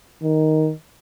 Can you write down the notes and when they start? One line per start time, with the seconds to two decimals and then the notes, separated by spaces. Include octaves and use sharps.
0.23 D#3